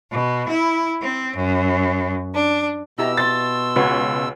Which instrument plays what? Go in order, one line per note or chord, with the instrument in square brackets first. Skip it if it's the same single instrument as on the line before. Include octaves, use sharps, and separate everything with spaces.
[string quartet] B2
E4
C4
F#2
D4
[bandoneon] B2 E6 [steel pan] E4 G4 A#5 [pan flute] D#5
[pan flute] C6 [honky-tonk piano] A6
[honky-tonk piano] C#2 [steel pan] F#4 B4 C#5